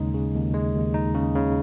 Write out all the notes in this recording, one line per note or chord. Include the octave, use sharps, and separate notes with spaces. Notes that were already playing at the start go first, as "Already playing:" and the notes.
Already playing: D#2 C#3 G#3 D#4
C#3
D#2
G#3
D#2
D#4
C#3
C#3